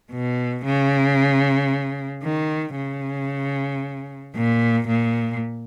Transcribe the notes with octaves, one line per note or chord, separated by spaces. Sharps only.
B2
C#3
D#3
C#3
A#2
A#2